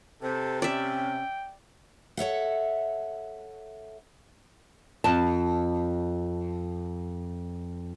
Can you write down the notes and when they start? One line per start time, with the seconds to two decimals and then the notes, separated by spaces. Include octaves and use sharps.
0.22 C3 A4 C5
0.62 C#4 D5 E5 G5
2.17 A4 C#5 E5 F#5
5.04 F2 A5